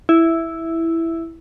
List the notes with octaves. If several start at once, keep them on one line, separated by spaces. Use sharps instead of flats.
E4